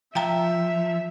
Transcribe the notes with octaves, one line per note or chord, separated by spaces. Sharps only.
F3 E5 F5 G5 A#5